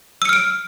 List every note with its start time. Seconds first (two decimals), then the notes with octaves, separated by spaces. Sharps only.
0.22 E6
0.25 C#7
0.29 F6
0.33 D7